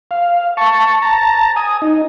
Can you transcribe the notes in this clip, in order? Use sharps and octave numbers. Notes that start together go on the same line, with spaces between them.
F5
A5 C#6
A5 A#5
G#5 D#6
D#4